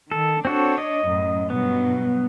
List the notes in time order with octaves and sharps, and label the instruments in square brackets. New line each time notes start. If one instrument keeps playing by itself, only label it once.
[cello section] D#3 [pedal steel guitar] A4
[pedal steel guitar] C4 F#4 A4 [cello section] D4 C#5
[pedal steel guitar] D#5
[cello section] F#2 A2
[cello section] G2 B2 F#3 [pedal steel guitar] B3